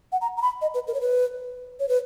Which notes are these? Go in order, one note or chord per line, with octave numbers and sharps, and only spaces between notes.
F#5
A#5
A#5
B5
D#5
B4
A#4
C#5
B4
C#5
B4